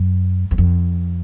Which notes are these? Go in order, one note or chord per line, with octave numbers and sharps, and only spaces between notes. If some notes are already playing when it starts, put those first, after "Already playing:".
Already playing: F#2
E2
F2